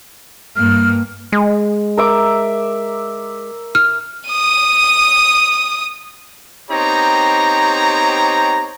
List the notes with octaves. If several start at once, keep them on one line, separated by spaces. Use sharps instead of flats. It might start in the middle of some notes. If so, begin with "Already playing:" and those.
G2 A#3 F6
G#3
A#4 E5 D6
F6
D#6 D#7
B3 C4 D#4 G4 C#5 A#5